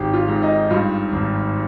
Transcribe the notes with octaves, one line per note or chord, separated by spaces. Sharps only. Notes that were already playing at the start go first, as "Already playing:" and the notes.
Already playing: G#1 G4
F4
G#2
D#4
G2 F4
G#1